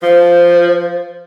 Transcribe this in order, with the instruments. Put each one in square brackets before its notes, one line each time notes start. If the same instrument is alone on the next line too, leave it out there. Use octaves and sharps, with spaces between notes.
[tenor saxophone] F3 [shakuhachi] C5